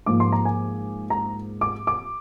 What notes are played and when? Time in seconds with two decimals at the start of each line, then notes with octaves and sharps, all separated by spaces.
0.06 G#2 F3 A#3 D6
0.20 C6
0.32 A#5
0.45 G#5
1.10 A#5
1.61 D6
1.87 D6